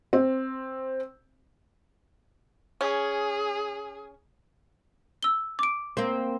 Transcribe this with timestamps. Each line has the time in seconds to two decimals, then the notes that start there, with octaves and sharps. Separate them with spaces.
0.13 C4
2.81 C#4 G#4
5.23 E6 G7
5.59 D6 D7
5.97 A#3 C4